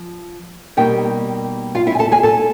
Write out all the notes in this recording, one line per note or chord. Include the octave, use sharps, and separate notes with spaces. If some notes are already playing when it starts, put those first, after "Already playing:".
Already playing: F3
B2 G3 A#3 D#4 G4 G5
F4 F5
E4 E5
G#5
A4 A5
G#4 G#5
A4 A5